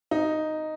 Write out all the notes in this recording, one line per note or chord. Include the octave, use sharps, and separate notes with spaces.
D#4